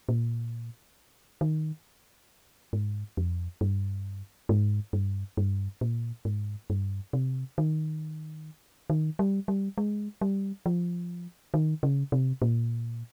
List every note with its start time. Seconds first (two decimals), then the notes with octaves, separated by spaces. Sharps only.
0.09 A#2
1.41 D#3
2.73 G#2
3.17 F2
3.61 G2
4.49 G#2
4.93 G2
5.37 G2
5.81 A#2
6.25 G#2
6.70 G2
7.13 C3
7.58 D#3
8.90 D#3
9.19 G3
9.48 G3
9.78 G#3
10.21 G3
10.66 F3
11.54 D#3
11.83 C#3
12.12 C3
12.42 A#2